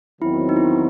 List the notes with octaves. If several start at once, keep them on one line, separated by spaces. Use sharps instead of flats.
E2 D#3 F#3 C4 E4
D#4
E4